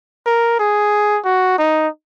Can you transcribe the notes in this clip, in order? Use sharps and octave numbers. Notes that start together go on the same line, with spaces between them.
A#4
G#4
F#4
D#4